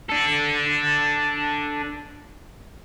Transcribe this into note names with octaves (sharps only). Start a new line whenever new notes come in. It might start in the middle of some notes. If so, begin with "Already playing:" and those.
D4 A4